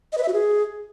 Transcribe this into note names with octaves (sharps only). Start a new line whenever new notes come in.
D#5
B4
E5
F#4
G#4